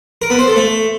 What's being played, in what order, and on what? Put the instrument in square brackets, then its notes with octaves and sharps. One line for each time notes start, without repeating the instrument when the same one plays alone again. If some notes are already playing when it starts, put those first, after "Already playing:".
[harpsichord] A#4
B3
C5
A4
A3